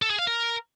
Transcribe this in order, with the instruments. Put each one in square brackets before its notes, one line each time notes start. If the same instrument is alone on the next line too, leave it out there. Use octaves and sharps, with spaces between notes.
[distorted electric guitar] A4
G#4
F5
A#4